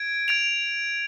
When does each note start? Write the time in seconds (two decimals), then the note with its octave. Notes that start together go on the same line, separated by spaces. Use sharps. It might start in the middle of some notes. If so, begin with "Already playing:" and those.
Already playing: G#6 D7
0.28 G#6 D7 F7